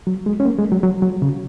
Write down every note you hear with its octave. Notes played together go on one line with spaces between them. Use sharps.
F#3
G#3
C#4
A#3
G#3
F#3
F#3
F#3
C#3